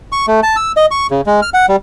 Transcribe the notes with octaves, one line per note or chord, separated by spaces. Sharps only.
C#6
A3
A5
E6
D#5
C#6
C#3
G#3
F6
F#5
G3